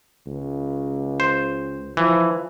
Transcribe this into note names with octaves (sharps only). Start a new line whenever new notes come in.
C#2
C5
E3 F3